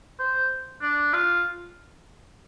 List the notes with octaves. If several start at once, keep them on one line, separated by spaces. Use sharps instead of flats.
C5
D4
F4